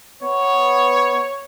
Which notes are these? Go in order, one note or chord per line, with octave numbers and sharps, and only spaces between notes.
B3 C#5